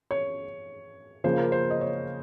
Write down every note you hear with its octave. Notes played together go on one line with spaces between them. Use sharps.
C#5
C#3 F3 A#3 C5
A#4
C5
D#5
C#5